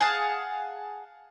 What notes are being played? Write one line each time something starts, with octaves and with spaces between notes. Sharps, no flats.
G#4 F5 F#5 A5